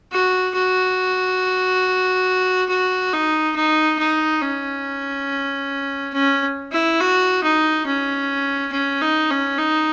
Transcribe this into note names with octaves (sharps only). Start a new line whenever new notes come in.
F#4
F#4
F#4
D#4
D#4
D#4
C#4
C#4
E4
F#4
D#4
C#4
C#4
D#4
C#4
D#4